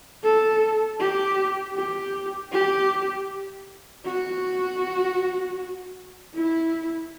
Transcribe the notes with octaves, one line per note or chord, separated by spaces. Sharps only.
A4
G4
G4
G4
F#4
E4